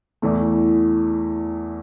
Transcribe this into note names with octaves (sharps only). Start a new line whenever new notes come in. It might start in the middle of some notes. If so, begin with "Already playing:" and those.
E2 E3 A3